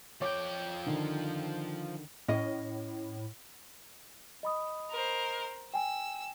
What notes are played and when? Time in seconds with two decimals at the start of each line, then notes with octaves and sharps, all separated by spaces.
0.22 F3 C#5 G5 D6
0.86 D3 D#3
2.28 A2 C#4 D#5
4.43 D#5 B5 D#6
4.90 A#4 C5
5.74 G5 G#5 E6